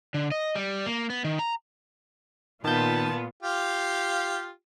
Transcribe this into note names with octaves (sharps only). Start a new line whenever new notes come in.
D3
D#5
G3
A#3
B3
D#3
A#5
A#2 D#3 B3 F4 A5 G6
F4 G4 F5